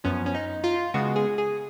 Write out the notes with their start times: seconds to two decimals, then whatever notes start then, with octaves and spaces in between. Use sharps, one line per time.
0.04 F#2 F3 B3 C#4
0.26 C#4
0.35 D#4
0.64 F4
0.94 C#3 G#3 B3 F#4
1.16 G#4
1.38 G#4